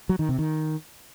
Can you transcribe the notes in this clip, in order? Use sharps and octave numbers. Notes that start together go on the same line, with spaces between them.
F#3
D#3
C3
D#3